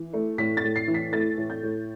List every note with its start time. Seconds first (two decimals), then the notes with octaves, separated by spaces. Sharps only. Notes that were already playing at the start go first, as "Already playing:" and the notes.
Already playing: E3
0.13 A3
0.38 A2 B6
0.57 A6
0.64 A2
0.76 C7
0.88 E3
0.94 B6
1.13 A3 A6
1.38 A2
1.50 G6
1.63 A2